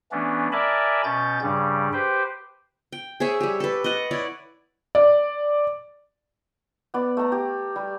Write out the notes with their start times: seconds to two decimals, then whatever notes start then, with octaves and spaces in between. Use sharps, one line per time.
0.12 E3 A3 B3 C#4 D4
0.52 A#4 D5 E5 G#5 A5 B5
1.04 B2 C#4 G6 A6
1.42 G2 C#3 G3
1.93 G4 B4 C5 G5
2.92 G5
3.20 G#4 C5 C#5 E5
3.40 G3 G4
3.60 A4 B4
3.84 D#5 F#5
4.11 E4 C#5 D5
4.95 D5
6.94 B3 D5
7.17 A3 A#5
7.32 G4
7.76 G3